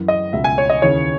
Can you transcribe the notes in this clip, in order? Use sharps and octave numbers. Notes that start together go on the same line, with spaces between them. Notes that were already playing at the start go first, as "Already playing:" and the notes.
Already playing: F#2 E3
D#5
C#2 B2 E5
G#5
C#5
D#5
D#2 C#3 E3 C#5